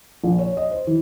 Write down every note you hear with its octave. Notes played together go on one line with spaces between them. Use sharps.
A#1
C#5
D#5
C5
E3